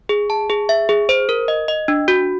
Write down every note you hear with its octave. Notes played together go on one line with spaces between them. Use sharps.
G#4
A5
G#4
E5
G#4
C5
A#4
D#5
D#5
D4
F#4